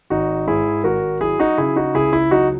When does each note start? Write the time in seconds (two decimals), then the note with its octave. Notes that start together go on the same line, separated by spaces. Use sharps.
0.10 G#1 D#4 F#4
0.47 G#2 E4 G#4
0.84 G#1 F#4 A#4
1.21 F#3 E4 G#4
1.39 D#4 F#4
1.58 C#3 E4 G#4
1.76 D#4 F#4
1.94 C#2 E4 G#4
2.13 E4
2.31 F#3 D#4 F#4